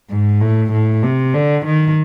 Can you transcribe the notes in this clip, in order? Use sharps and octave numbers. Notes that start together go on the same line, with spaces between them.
G#2
A2
A2
C3
D3
D#3